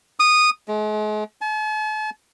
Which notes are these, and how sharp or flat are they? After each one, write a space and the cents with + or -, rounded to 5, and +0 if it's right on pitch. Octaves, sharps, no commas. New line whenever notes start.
D#6 -15
G#3 +40
A5 -45